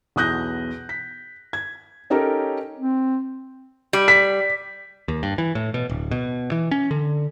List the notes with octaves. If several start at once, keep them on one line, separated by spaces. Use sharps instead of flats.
B1 E2 D#6 F#6 G6 A#6
B6
G#6
C#4 D#4 G4 A4 A#4 C#5
C4
G3
B6
D#2
G2
E3
A2
B2
D1
B2
E3
C#4
D3